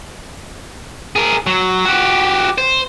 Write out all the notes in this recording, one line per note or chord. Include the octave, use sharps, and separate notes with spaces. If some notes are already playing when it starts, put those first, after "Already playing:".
G#4 A#4
F#3
F#4 G4
C5